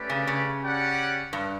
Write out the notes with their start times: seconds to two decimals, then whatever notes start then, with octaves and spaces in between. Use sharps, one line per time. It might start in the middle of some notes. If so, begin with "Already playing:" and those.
Already playing: A3 C#4 G4 B4 D5
0.10 C#3
0.27 C#3
0.62 C#4 G4 D5 F#5
1.33 G2